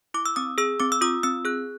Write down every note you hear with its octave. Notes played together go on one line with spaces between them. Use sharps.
E4 D6
E6
C4 D#6
G#4 E6
C4 D6
E6
F4 D#6
C4 E6
G#4 F#6